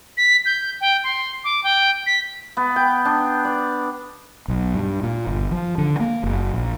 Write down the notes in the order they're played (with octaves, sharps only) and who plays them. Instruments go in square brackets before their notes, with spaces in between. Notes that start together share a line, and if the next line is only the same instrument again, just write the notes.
[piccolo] B6
G6
G5
C6
D6
G5
B6
[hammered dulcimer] B3
G5
D4
D5
[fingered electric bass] B1
G2
A#2
G1
F3
D3
A#3
F#1
A#1